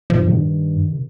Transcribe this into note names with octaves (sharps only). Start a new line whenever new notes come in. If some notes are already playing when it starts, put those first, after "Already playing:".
G2 F3
G2 D#3
C3